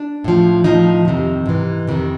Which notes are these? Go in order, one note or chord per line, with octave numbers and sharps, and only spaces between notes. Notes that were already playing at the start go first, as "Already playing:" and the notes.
Already playing: D4
A2 F3
A2 F3 D#4
F2 C3 D#3
G#2 E3
F2 C3 D#3